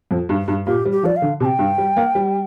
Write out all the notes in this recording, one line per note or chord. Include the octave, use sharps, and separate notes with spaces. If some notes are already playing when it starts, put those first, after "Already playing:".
F2
G2
G2
A#2 G4
G3
G4
F3 D5
F5
D3
C3 A5
G5
G2
G3
A#3
G3